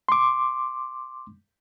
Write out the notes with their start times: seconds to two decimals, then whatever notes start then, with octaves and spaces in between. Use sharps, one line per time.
0.09 C6 D6